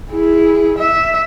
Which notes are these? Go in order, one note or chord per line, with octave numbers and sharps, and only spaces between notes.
E4 G#4
E5